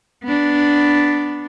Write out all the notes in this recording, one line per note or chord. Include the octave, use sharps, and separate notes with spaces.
B3 D4